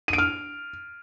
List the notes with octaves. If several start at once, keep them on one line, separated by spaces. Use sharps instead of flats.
D#7
D7
F6